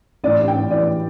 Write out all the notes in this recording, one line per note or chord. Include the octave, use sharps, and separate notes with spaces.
A1 D5
G2
G5
A1
E3 D5